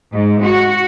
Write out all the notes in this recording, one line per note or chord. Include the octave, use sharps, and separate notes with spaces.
G#2
F#4